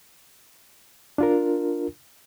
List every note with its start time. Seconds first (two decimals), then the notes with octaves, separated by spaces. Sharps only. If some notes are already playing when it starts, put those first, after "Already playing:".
1.18 D4 F4 A#4